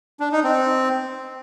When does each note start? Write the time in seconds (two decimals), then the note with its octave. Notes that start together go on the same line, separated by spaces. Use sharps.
0.20 D4
0.32 D#4
0.44 C4